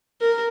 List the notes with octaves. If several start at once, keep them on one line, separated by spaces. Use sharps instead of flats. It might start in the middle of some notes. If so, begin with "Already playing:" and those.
A#4